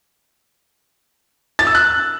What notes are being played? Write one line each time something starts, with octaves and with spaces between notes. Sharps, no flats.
A6
E6
F#6